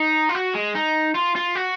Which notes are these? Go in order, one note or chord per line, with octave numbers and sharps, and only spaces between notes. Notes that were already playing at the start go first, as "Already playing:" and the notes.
Already playing: D#4
F4
F#4
G#3
D#4
F4
F4
F#4